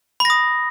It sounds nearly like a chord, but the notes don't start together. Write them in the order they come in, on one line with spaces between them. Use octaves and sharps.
B5 A#6 D#6